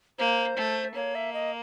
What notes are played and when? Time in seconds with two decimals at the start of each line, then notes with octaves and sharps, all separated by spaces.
0.18 A#3 C5
0.57 A3
0.95 A#3 C#5
1.15 E5
1.34 D#5